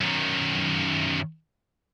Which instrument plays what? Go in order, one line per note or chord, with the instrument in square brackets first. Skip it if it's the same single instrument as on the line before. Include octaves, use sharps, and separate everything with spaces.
[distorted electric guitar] F#2 D#3